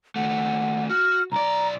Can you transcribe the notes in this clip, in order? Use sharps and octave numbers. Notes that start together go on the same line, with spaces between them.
D#2 A3 F#5
F#4 F6
B1 D5 A#5